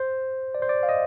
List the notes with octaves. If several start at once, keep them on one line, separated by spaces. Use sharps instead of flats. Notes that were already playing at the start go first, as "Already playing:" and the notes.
Already playing: C5
D5
C5
D5
F5
D#5